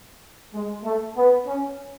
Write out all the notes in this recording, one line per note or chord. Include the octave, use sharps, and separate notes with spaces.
G#3
A3
B3
C#4